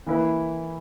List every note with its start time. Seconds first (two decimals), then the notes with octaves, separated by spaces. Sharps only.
0.06 E3 A#3 E4 B4